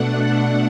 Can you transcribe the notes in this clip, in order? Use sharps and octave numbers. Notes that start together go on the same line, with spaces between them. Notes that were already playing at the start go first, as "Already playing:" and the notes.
Already playing: B2 A3 D4 F#5